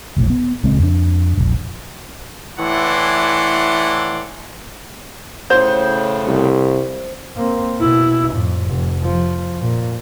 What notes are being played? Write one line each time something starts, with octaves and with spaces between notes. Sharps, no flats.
F1 B1 A2
B3
D1 C#2 G#3 C4
F2 D4
E1 A#1
A2 E3 E4 D5 F#5 C6
A2 C#3 C5 G6
C2
A#3 C4
B2 E4
F2 A2
F1
F3
A#2